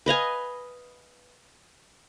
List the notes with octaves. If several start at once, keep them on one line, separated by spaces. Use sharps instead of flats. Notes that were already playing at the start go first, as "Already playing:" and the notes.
B4 D#5 F5 G#5